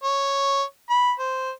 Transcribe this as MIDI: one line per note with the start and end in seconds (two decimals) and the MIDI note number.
0.04 0.63 73
0.90 1.13 83
1.20 1.51 72